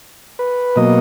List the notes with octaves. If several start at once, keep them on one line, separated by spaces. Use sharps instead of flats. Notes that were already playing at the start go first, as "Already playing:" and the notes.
B4
B2 F#3 A#3 D#5